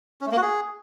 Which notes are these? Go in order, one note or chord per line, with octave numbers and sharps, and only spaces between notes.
C#4
A3
A#3
F#4
G#4